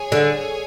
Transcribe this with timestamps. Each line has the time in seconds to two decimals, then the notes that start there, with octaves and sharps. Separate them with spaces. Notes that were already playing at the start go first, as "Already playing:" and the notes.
Already playing: G#4 C#5 G#5
0.12 D3